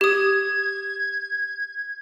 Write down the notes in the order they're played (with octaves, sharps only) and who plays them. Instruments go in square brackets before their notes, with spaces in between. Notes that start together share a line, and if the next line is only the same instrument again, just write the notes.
[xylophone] G4 D#6 [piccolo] G#6